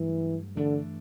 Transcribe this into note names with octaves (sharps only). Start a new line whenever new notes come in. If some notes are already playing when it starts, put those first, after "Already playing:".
Already playing: G2 E3 F#3 A3
G2 D3 E3 A3 D4